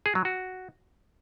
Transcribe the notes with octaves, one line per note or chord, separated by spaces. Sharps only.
G#4
F#3
F#4